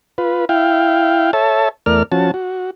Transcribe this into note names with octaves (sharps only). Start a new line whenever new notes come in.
F4 B4
E4 F5 G5
A4 C#5 E5 A5
E2 A3 A#4 D5 F6
F3 C#4 F#4 A5
F#4